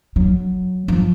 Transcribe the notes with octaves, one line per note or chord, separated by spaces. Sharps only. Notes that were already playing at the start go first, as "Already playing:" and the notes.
F#3
F3